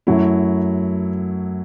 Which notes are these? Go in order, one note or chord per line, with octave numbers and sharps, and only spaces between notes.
F#2 F#3 A3 E4